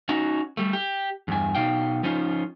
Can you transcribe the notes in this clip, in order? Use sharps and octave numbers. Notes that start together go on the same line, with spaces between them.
C#4 D#4 F#4
G3 A3
G4
E2 G2 G#5
B2 D#4 F5 G5
F3 C#4 D#4 F4